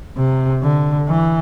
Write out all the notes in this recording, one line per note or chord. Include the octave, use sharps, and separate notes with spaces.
C3
D3
E3